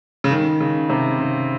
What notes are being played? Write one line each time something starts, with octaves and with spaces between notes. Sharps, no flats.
C#3
D#3
C#3
C3
C#3